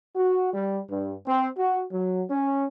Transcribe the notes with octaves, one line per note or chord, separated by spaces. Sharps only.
F#4
G3
G2
C4
F#4
F#3
C#4